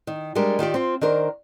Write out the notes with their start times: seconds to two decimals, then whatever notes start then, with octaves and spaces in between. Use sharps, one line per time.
0.07 D#3
0.35 G3 G#3 D4 G4 A#4
0.59 D#3 F4 G4 D5
0.74 C4 F4
1.01 D#3 D4 A#4 C5